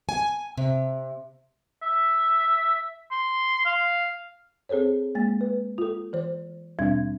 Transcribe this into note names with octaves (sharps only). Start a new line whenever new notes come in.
G#5
C3
E5
C6
F5
C4 G#4 A4 C5 C#5
G#3 A#3 A6
B4
F4 A4
E3 C5
D#2 B2 G3 C4 D4 G#6